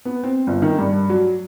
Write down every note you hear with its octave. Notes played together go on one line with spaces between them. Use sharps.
B3
C4
G1
D#3
G2
F#3